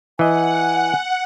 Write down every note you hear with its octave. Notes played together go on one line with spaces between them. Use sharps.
E3 D#5 F#5 G#5